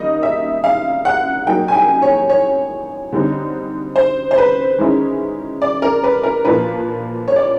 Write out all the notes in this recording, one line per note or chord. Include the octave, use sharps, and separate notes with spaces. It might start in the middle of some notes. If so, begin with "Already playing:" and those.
Already playing: D#3 G3 A#3 D#4 D#5
E5
F5
F#5
F#3 A#3 D#4 G5
G#5
G5
C#5
C#5
D3 G3 C4 D#4
C5
C5
B4
D#3 G#3 C#4 E4
D5
A#4
B4
A#4
A#2 F3 A#3 D4 B4
C#5
D5